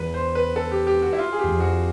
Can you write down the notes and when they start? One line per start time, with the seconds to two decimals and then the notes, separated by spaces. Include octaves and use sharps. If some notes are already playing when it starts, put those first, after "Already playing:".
Already playing: E2 B4
0.14 C5
0.35 B4
0.56 A4
0.71 G4
0.87 G4
1.02 F#4
1.13 E4
1.19 F4
1.32 G#4
1.39 G4
1.44 E2
1.49 F2
1.60 F#4